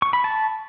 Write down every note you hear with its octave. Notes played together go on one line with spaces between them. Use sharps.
C#6
B5
A5